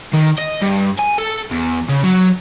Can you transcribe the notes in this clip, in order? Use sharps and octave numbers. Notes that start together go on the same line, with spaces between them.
D#3
D#5
G2
G#5
A4
E2
C#3
F#3